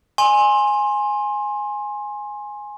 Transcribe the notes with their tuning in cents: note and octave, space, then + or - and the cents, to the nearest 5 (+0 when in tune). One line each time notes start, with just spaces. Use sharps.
G#5 +0 C6 +25